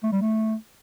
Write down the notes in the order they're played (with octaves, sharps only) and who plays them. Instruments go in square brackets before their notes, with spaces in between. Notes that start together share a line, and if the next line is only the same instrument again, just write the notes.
[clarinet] A3
G3
A3